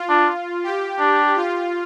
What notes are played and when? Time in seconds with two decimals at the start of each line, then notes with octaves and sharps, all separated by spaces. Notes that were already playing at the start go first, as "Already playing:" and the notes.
Already playing: F4
0.09 D4
0.64 G4
0.99 D4
1.36 F4